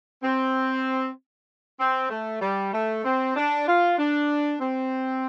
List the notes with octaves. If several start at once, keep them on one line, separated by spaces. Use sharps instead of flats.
C4
C4
A3
G3
A3
C4
D4
F4
D4
C4